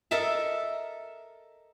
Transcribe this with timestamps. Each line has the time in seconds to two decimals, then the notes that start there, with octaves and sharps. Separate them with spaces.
0.11 A4 A#4 D#5 E5 A5